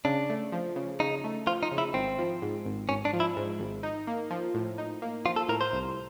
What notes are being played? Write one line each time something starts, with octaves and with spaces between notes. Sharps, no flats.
C#3 D4
A3
F3
C#3
C#3 D#4
A3
F3 F4
D#4
C#3
E4
G#1 C4
F3
G#2
G#1
G#1 C#4
D4
F3
E4
G#2
G#1
D#4
A#3
F3
A2
D#4
A#3
F3 F4
A4
A2 A#4
C5
C2